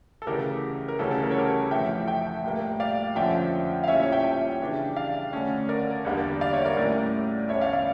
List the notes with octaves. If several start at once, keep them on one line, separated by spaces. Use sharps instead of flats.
A4
D2 C#3 E3 G4 A#4
A#4
D2 C#3 E3 G3 C#4 A4
A4
A#4
C#5
G4 A#4
F2 E3 A3 E5 G5
E5 G5
A2 G3 A#3
D5 F5
F2 D3 F3 C#4 E5 G5
F5
A#2 G3 C#4 E4 C#5 E5
C#5 E5
E5 G5
E5 G5
C#3 E3 G3 D4
D5 F5
D2 D3 A3 C#4
A#4 D5
E2 D3 G3 A#3 D4
D5 F5
C#5 E5
A#4 D5
A2 G3 C#4 E4 A#4 D5
E2 D3 A3 C#4 C#5 E5
D5 F5
D5 F5